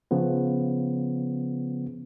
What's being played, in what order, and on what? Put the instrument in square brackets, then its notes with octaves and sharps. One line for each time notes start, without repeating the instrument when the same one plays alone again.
[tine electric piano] C#3 F3 B3